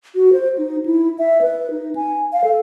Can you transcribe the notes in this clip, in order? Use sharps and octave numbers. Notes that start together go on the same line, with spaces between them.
F#4
C5
D#4
E4
E5
B4
D#4
G#5
F5
A4